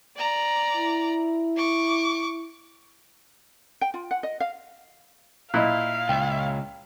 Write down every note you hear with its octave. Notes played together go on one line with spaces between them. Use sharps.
D5 A#5
E4
C#6 D6
G5
F4
F#5
D#5
F5
A#2 E4 D#5 F5 F#6
C#2 G5